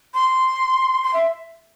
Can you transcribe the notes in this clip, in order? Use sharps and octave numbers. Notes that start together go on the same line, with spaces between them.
C6
C6
E5